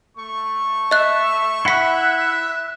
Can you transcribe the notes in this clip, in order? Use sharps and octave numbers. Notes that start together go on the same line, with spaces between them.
A3 C#6
D#5 E5 F#6
E4 E5 F#5 B5 C#6 F#6 B6